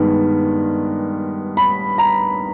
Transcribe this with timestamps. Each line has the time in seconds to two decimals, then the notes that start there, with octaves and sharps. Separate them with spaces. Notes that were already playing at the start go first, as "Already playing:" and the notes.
Already playing: G2 D#3 G#3 B3
1.57 B5
1.98 A#5